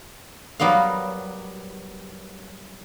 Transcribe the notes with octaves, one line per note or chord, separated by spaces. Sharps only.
F#3 G3 B3 A#4 F5